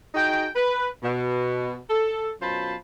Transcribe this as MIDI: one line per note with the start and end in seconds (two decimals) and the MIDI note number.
0.15 0.47 63
0.15 0.47 66
0.15 0.47 68
0.15 0.47 79
0.56 0.89 71
1.03 1.78 47
1.90 2.30 69
2.41 2.75 42
2.41 2.75 47
2.41 2.75 65
2.41 2.75 72
2.41 2.75 81
2.41 2.75 83